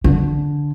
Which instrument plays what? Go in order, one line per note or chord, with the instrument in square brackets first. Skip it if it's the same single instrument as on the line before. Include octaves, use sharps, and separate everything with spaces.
[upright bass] D3